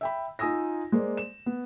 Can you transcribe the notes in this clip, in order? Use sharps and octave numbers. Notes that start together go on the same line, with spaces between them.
E5 G5 B5
D#4 F4 G#5 D#6 E6 A#6
G#3 A#3 C5 D5
E7
B3